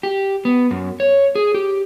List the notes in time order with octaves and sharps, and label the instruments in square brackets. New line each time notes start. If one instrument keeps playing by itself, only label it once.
[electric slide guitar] G4
B3
F#2
C#5
G#4
G4